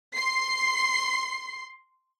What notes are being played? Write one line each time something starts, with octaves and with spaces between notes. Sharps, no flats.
C6 C7